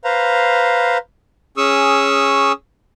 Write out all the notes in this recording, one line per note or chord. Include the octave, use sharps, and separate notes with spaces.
B4 C5 F5 A#5
C#4 G#4 C#6 D#6 E6